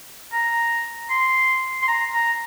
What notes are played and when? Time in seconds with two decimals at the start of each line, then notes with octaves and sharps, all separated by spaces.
0.33 A#5
1.10 C6
1.82 C6
1.88 A#5
2.13 A#5